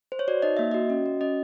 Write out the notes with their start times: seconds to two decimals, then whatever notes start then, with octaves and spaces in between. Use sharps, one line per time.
0.12 C5
0.19 C#5
0.28 F#4 D5
0.42 D#4 D#5
0.57 A#3 E5
0.71 F#4 D#5
0.90 C#4
1.06 F#4
1.21 C#4 D#5